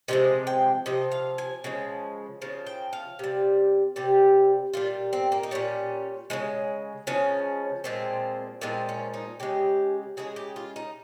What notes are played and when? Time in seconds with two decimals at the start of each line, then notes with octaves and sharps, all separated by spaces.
0.08 C3 F3 G#3 D#5
0.47 G5
0.86 C3 F3 D#5
1.12 F5
1.38 G#5
1.64 C#3 F3 G#3
2.42 C#3 F3
2.67 G5
2.93 F5
3.19 C3 G3
3.96 C3 G3 G4
4.73 A#2 G3 F4
5.13 C4
5.32 A#3
5.43 D#4
5.51 A#2 G3 C#4
6.30 C#3 F3 G#3
7.07 C#3 F3 G#3 C#4
7.84 A#2 F3 G#3 C4
8.61 A#2 F3 G#3 C4
8.89 C#4
9.14 D#4
9.40 C#3 G#3 G4
10.17 C#3 G#3 G#4
10.36 G4
10.56 F4
10.76 D#4